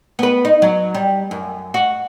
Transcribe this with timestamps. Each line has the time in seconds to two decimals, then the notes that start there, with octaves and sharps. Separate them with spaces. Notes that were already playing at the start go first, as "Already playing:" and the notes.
0.19 B3 B4
0.45 D#4
0.62 F#3
0.94 G3
1.31 F#2
1.74 F#4